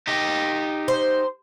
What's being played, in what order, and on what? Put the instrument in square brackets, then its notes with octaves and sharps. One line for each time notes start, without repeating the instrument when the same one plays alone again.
[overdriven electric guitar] D#4 G4
[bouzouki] C5